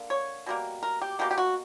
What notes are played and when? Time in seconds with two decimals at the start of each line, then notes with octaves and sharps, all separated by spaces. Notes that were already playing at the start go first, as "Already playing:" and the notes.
Already playing: D3 A#3
0.10 C#5
0.46 B2 G3 A#3
0.83 A#4
1.02 G4
1.19 B2 A#3 G4
1.31 G4
1.38 F#4